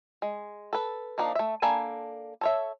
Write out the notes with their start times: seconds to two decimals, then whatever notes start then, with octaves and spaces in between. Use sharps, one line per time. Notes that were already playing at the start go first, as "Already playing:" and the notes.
0.22 G#3
0.73 A4 B4
1.18 F3 A#3 D4 D#4
1.35 A3 E5
1.62 A#3 D4 A4 G#5 B5
2.41 A4 C#5 E5